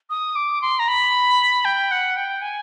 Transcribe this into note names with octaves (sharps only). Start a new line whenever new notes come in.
D#6
D6
C6
A#5
B5
G5
F#5
G5
G#5